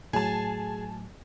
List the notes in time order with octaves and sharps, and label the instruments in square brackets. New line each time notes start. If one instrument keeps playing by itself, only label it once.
[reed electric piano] A2 F#3 [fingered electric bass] A3 [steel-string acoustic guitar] G#4 [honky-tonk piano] G#5 A5